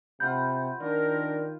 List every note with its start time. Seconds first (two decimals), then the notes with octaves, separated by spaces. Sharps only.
0.20 C3 F4 F#5 B5 G6
0.80 D#3 D4 F4 A#4